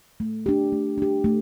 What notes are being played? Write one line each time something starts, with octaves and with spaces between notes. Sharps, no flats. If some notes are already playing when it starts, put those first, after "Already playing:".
A3
D4 G4
A3
D4 G4
A3